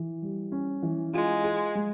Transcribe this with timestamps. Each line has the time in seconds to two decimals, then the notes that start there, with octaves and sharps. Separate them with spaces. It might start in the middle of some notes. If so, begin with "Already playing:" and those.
Already playing: E3
0.22 G3
0.52 C#4
0.83 E3
1.13 G#3 F4
1.44 G#4
1.75 G#3